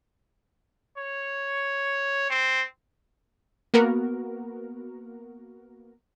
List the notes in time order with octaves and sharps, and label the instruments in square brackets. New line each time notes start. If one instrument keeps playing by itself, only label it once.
[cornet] C#5
C4
[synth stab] A#3 B3 F#4 A#4